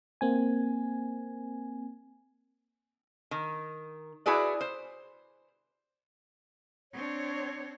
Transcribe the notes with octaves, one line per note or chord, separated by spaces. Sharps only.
A#3 C4 G#5
D#3
E4 F#4 G#4 B4 D5
C5
C4 D4 C#5